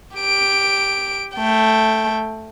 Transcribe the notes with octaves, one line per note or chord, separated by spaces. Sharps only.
G4 D7
A3 G5